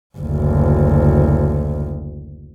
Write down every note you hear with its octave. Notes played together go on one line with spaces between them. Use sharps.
F#1 D2